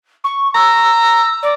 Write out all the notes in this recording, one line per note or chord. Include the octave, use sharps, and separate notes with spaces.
C#6
A#5 E6
D5